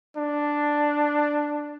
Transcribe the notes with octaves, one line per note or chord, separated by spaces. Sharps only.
D4